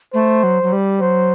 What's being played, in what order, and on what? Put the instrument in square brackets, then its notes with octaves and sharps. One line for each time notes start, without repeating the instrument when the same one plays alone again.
[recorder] A3 [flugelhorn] C5
[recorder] F#3
F#3
G3
[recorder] F#3 [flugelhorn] C5